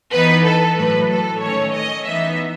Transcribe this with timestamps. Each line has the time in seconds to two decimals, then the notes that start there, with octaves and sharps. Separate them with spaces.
0.12 E3 B3 D#4 B4
0.45 A4
0.77 A2 F#3 A3 B4
1.09 A4
1.41 D#3 A3 C#4 C#5
1.74 D#5
2.06 E3 B3 D#4 E5